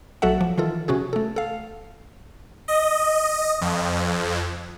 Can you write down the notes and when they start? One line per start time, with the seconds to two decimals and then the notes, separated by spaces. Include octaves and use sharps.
0.22 A#1 F#3 F#4 A4 E5 F#5
0.41 F3
0.58 D#3 E3 F4 A4
0.88 C3 C#4 F#4 G#4
1.13 A3 A4
1.36 A4 F5
2.68 D#5
3.61 F2